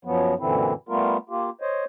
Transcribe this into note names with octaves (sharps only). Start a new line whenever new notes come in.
F#2 F3 F#3 B3
F#2 A#2 D3 E3 C4 E4
G3 A3 B3 F4 A#4
A#3 F4 G4
C5 C#5 D#5